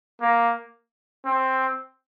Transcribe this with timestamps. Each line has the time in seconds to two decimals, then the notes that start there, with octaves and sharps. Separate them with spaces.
0.21 A#3
1.25 C4